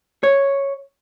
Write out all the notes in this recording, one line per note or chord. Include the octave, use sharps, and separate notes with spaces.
C#5